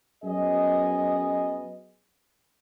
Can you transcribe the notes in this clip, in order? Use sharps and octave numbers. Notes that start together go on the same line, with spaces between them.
F#2 F#3 B3 G#4 D#5